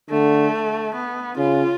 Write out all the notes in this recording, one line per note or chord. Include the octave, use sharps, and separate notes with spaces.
D3 A3
B3
C#3 F4